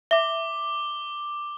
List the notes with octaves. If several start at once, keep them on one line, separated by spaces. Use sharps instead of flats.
E5 D6 G7